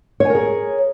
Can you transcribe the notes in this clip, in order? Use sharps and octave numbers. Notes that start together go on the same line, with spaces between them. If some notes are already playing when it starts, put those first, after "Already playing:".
G#4 A#4 C#5 G#5